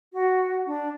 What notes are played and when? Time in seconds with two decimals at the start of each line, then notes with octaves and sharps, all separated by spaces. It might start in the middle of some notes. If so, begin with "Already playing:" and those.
0.13 F#4
0.67 D4